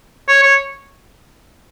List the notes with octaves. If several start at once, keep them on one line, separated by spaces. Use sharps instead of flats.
C#5
C#5